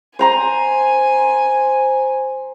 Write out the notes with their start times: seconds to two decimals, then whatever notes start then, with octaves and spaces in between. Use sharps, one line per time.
0.19 C5 G#5 A#5 C6